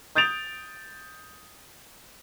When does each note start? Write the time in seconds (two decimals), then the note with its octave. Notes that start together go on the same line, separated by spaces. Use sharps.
0.16 D#6 G6 A6 D7 F7